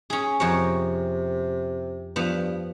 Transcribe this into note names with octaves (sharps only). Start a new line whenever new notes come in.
C#4 G#4
F2 C3 A#4 C#5
G2 F3 B3